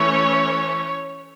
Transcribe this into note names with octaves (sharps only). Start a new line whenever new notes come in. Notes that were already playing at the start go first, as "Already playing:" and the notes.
Already playing: E3 A3 C#4 C#5